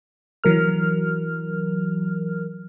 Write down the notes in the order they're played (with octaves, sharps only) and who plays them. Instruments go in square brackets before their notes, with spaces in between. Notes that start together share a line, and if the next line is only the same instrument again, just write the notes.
[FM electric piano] E3 F#3 A#4 F6